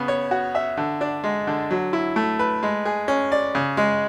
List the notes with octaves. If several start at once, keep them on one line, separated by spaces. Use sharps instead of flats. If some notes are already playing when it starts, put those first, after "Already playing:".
Already playing: C#3 B3
C#5
F#4
E5
D3
D4
G#3
D3
F#3
E4
A3
B4
G#3
G#4
C#4
D5
C#3
G#3